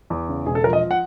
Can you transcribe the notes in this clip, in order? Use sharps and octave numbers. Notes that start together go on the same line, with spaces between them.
E2
C#3
E1 G#4
A4
F3 A#4
D#5
F#5